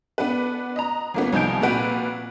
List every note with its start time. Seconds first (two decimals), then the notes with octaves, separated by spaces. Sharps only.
0.18 B3 D4 B4
0.76 D#5 A#5
1.14 G1 A#3 B3
1.33 C2 F3 D#4 G#5 G6 D7
1.61 A#2 C4 F#4 B4 D7